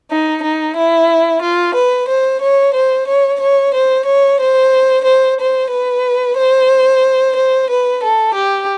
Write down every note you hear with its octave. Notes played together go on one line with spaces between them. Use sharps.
D#4
D#4
E4
F4
B4
C5
C#5
C5
C#5
C#5
C5
C#5
C5
C5
C5
B4
C5
C5
B4
A4
G4